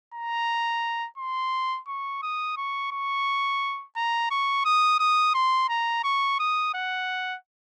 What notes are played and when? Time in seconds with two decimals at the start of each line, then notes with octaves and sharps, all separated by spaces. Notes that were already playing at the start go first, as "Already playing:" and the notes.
0.14 A#5
1.18 C6
1.87 C#6
2.22 D#6
2.57 C#6
2.92 C#6
3.96 A#5
4.31 C#6
4.65 D#6
5.00 D#6
5.34 C6
5.69 A#5
6.04 C#6
6.39 D#6
6.74 F#5